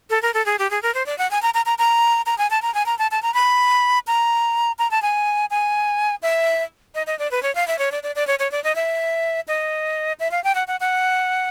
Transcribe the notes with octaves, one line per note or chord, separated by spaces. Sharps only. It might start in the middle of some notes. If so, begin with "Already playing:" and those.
A4
A#4
A4
G#4
G4
G#4
A#4
C5
D5
F#5
G#5
A#5
A#5
A#5
A#5
A#5
G#5
A5
A#5
G#5
A#5
A5
A5
A#5
B5
A#5
A#5
A5
G#5
G#5
E5
D#5
D#5
D5
B4
C#5
F5
E5
C#5
D5
D5
D5
C#5
C#5
D5
D#5
E5
D#5
E5
F5
G5
F#5
F#5
F#5